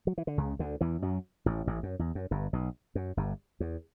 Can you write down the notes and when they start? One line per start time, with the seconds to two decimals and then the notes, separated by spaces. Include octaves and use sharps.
0.07 F#3
0.18 E3
0.27 D3
0.38 C#2 C#3
0.59 D2 D3
0.81 E2 E3
1.02 F#2 F#3
1.46 A1 A2
1.67 A1 A2
1.83 F#2
1.99 E2
2.15 F#2
2.31 G1 G2
2.53 B1 B2
2.95 F#2
3.17 G1 G2
3.60 E2